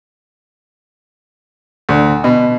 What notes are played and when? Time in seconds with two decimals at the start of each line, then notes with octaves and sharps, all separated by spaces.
1.89 D2
2.24 B2